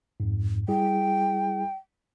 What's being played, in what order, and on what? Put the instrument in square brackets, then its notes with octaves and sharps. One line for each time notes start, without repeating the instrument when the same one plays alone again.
[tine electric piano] F2 G#2
[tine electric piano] G3 E4 G#4 [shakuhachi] G5